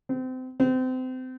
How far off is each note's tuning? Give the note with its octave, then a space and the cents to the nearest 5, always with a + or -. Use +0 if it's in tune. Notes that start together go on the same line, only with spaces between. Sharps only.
C4 -30
C4 -30